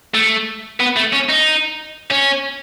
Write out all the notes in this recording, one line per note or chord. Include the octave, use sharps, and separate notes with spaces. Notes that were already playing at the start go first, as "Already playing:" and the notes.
A3
B3
A3
C#4
D#4
C#4